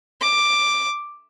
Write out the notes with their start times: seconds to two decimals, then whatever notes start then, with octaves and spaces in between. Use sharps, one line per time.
0.21 D6